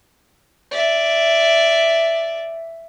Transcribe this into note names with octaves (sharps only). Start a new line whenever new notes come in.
D5 E5